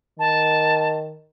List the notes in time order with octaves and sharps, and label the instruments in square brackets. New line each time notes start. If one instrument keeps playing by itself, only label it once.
[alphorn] D#3 [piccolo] A5